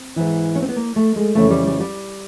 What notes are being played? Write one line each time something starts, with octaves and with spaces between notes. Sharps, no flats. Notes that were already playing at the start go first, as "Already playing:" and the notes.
Already playing: C4
G#2 E3
C#4
C4
B3
A#3
A3
G#3
F2 C#3 E3 A3
G3
G3
G3